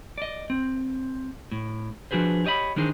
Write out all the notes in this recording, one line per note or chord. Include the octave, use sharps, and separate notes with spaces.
D5 D#5
C4
A2
F3 D4 F#4 G#4 B4 C5
G4 C#5 D#5 E5 B5
D#3 E3 D4 D#4 G#4 C5